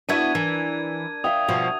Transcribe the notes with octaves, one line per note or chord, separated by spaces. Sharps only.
B3 D4 E4 F#4 G#6 D#7
E3 A#4
E5 F5 G5 D#6
B2 F3 F#4